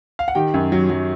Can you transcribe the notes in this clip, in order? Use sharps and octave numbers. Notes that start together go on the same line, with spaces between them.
F5
F#5
D#3 G4 G5
F#2
F#3
F#3